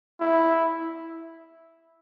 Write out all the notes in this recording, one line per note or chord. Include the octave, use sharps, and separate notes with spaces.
E4